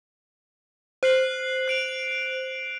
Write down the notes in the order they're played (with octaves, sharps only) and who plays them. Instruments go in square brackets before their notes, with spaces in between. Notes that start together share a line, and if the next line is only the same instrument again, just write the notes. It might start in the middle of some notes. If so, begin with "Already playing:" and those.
[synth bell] C5 [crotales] F#6 C7 F#7
[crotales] F#6 D7 F7